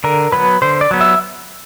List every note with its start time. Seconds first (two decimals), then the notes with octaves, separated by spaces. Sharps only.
0.04 D3 A#4
0.32 F#3 B3 B4
0.62 D3 C5
0.81 D5
0.91 F#3 B3
1.01 E5